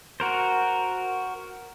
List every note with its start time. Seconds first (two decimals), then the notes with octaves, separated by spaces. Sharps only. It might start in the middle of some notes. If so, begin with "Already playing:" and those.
0.20 F#4 A#4 C5